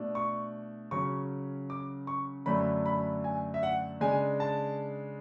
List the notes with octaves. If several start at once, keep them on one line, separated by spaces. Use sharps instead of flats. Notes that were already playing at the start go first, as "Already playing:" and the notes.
Already playing: B2 A3 D4
C#6
C#3 F#3 C#4 C#6
D6
C#6
F#2 D3 F#3 A3 D4 B5
B5
G#5
E5
F#5
C#3 G#3 D4 G#5
A5